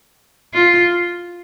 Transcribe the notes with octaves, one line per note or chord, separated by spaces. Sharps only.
F4